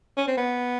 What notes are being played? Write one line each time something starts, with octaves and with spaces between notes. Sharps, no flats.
C#4
C4
B3